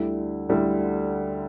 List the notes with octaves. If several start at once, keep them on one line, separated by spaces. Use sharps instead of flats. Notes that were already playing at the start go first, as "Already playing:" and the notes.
Already playing: D2 D3 G3 E4
D2 D3 G3 E4